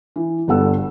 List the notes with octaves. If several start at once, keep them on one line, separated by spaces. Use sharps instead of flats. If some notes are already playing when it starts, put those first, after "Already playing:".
E3
G1 G3 B3 A4 F#5 E6